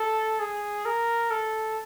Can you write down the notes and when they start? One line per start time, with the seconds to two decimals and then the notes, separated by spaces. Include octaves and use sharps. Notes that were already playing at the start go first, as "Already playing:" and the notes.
Already playing: A4
0.40 G#4
0.85 A#4
1.31 A4